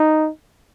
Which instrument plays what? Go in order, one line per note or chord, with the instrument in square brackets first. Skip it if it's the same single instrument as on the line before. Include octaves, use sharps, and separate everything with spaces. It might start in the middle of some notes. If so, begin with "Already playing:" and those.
Already playing: [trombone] D#4